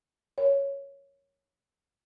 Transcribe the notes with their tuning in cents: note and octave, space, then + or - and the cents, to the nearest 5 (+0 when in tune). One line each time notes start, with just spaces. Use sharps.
A#4 +0 C#5 +0